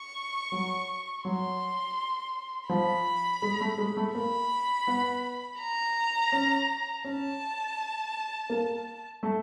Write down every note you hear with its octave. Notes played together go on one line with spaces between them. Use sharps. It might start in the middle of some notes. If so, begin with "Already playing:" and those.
Already playing: C#6
F#3
F#3 C6
F3 B5
G#3
A3
G#3
A3
A#3 B5
B3
A#5
C#4
C#4 A5
A#3
A3